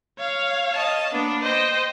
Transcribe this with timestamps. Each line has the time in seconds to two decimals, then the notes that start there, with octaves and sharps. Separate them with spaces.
0.19 C#5 F5
0.73 D#5 A5
1.11 A#3 B3 D4
1.43 C5 D#5 G5